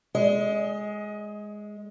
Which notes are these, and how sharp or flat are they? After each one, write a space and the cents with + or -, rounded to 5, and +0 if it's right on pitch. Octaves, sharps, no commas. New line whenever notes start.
G#3 +0 D#5 +25